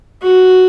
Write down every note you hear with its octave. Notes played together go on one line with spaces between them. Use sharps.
F#4